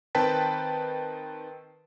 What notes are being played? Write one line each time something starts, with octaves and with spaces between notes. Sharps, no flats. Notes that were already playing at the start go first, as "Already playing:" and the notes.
D#3 C4 B4 G5 A5 B6